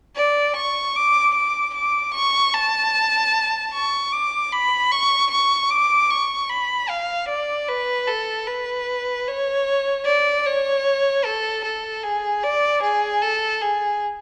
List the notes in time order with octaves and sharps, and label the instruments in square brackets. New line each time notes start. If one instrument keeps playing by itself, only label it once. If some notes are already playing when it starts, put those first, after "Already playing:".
[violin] D5
C#6
D6
D6
D6
C#6
A5
C#6
D6
B5
C#6
C#6
D6
C#6
B5
F5
D5
B4
A4
B4
C#5
D5
C#5
A4
A4
G#4
D5
G#4
A4
G#4